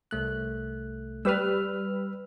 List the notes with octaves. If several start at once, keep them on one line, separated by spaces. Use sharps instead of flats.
C2 A3 F#6
G3 B4 E6 F6